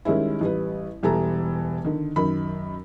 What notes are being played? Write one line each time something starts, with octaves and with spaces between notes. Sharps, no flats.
D#3 G3 G#3 C#4 E4
A1 G3 B4
E1 E3 G3 A4 A#5
D3 D#3
F#2 D#3 B5